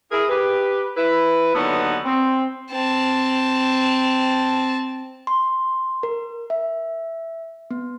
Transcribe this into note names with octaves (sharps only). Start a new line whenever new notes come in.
E4 G#4 A#4
G4 B4
E4 B4
D#2 D3 F#3 B3 D#4 C#5
C4
C4 A5
C6
A#4
E5
B3